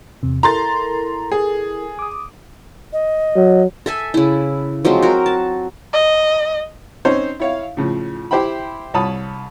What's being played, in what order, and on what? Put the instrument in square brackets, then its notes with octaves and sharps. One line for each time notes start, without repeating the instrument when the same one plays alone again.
[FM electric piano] E2 C3
[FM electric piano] E4 A4 A#4 [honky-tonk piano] A#5 C6 A6
[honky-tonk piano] G#4
[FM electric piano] D6 D#6
[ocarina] D#5
[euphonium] F#3
[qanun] A4 E5 G#5
C#3 E4
F3 F#3 G#3 C4
F#4 A#4
A5
[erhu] D#5
[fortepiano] C4 C#4 D#4 C5 C#5
E4 C#5 F5
A2 C#3 F3
E4 G4 C5 E5 G5 B5
C2 C#5 A5 B5 D#6